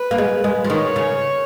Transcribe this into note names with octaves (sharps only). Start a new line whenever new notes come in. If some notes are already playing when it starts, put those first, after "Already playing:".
Already playing: B4
A#3
G#3
G#3
F3
D#3 C#5
C#3